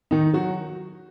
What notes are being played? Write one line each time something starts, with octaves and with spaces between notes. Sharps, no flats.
D#3 D#4
F#3 F#4